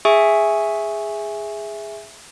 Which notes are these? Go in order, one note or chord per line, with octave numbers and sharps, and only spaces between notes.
G#4 E5 G#5 C#6